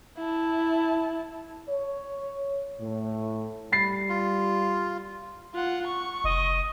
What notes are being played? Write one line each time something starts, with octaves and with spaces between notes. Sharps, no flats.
E4 A5
C#5
A2
G3 B5 A6 C7
F4
F4 F#5
C#6
F1 D#5